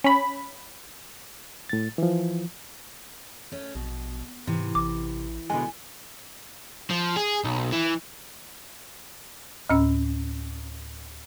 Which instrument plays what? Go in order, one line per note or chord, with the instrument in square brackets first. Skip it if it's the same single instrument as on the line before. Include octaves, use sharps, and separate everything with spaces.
[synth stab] C#4 B5
[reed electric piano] A2 A6
E3 F3
[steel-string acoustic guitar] A3 C#4
[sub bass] A#1 [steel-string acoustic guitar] B2
[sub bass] G#2 [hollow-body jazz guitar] C3 [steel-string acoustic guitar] E3
[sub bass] A1 [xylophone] D6
[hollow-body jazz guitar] B2 D3 G#3 [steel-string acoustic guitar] B3 [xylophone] G#5
[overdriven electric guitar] F3
G#4
B1
E3
[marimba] D2 A2 C#4 E6